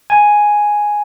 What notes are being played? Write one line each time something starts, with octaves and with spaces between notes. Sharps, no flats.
G#5